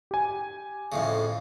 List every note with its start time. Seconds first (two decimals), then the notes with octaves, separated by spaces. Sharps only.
0.11 G4 G#5
0.92 F2 A2 C#3